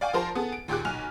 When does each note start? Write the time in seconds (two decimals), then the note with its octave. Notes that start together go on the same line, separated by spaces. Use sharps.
0.01 D5 F5 G5 G#5 C#6
0.13 F3 F4 A#4 C5 A5 C6
0.35 B3 G#4 A4
0.53 D7
0.68 D#2 A#2 G4 G#4 D6 F#6
0.85 B1 G#5 F6 F7